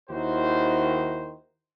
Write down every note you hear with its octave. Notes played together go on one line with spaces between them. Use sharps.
D#2 D#3 E4 F#4 C5